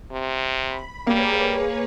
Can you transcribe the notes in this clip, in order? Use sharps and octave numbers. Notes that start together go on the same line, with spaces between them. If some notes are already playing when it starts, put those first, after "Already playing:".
C3
B5
G3 A#3 G#4 B4 C#5